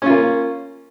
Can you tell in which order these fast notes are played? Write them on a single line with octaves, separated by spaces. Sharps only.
C#4 F4 A#3